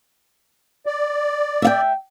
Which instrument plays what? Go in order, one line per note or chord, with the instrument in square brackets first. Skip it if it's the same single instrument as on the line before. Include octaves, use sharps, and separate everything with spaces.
[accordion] D5
[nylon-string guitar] E5 F5 G5